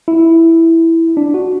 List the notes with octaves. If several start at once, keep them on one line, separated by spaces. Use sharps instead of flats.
E4
D4
F#4